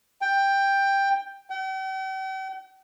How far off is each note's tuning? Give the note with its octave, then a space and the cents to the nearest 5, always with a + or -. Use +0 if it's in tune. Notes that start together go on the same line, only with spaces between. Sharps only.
G5 +10
G5 -45